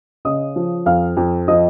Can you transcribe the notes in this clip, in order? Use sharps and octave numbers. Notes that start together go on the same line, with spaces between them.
C#3 D#5 D#6
F3
F2 F5 F6
F2
F3 D#5 D#6